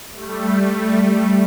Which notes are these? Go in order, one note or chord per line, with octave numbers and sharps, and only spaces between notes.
G3 A3